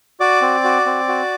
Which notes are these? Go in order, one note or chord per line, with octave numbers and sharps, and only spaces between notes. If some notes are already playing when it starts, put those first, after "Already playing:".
F#4 D5 D6
C4
F#4
C4
F#4